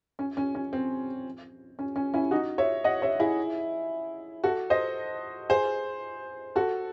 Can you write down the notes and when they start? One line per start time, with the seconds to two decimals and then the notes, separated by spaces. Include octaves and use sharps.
0.19 C#4
0.37 C#4
0.55 C#4
0.73 C4
1.79 C#4
1.96 C#4
2.14 C#4 E4
2.31 D#4 F#4
2.58 C#5 E5
2.84 D#5 F#5
3.02 C#5 E5
3.20 E4 G#4
4.44 F#4 A4
4.70 C5 D#5
5.49 G#4 C5
6.56 F#4 A4